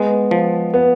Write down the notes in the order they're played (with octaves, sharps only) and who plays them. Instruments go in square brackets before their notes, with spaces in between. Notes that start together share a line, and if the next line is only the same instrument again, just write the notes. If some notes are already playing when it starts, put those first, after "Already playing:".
Already playing: [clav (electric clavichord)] G#3 [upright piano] B3
[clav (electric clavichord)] F3
[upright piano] B3